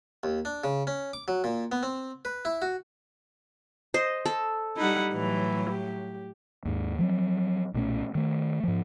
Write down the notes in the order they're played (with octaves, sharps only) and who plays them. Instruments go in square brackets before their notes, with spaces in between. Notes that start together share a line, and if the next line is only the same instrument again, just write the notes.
[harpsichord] D#2
D4
C#3
C#4
D6
F#3
A#2
B3
C4
B4
E4
F#4
[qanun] C5 D#5
A4
[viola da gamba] G3 D#4 [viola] E4 F#5
[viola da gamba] A2 F#3 [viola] E3
[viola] G4
[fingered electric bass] D#2 G#2
F3 F#3 C4
B1 A#2 A3 C#4
D#3 A3
G#2 F3